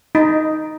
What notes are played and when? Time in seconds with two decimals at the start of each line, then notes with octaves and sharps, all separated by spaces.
0.15 D#4